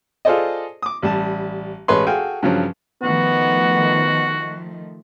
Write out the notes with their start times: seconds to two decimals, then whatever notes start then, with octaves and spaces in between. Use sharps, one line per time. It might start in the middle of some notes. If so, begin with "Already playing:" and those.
0.25 F4 G#4 A4 C5 D5 D#5
0.82 D6 D#6
1.02 A1 G3 A5
1.88 A1 G#3 B4 C#5 C6
2.07 F#4 G#4 A4 F5 G5 G#5
2.43 G2 C#3 F3 F#3
3.03 D#3 F3 A3 B3 F#4